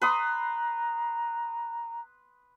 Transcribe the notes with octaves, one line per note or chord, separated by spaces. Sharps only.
B4 A#5 C6 D#6